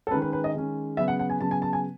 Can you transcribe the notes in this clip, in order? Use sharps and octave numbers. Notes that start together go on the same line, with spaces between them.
A4
D#3 G#3 C#4 B4
B4
B4
D#5
D#3 G#3 C#4
C#3 F#3 B3 E5
F#5
F#5
G#5
C#3 F#3 B3 A5
G#5
A5
G#5